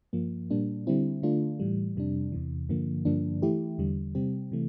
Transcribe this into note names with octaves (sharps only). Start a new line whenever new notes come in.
G2 F3 A#3
A#2 G3 A#3 D4
D3 G3 C4 E4
D3 A3 D4 F4
A2 E3 G3
F2 C3 G3 D4
E2 C3 E3
G2 D3 F3 A#3
G2 D3 F3 A#3 D4
E3 A3 E4 G4
E2 D3 G3
C3 G3 C4 G4
C3 E3 A3